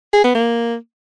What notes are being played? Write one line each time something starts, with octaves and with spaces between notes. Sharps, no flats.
G#4
B3
A#3